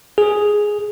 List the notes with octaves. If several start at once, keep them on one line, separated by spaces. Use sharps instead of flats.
G#4